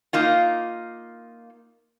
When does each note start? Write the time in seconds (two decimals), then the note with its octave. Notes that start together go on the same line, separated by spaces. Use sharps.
0.13 A#3 D#4 F4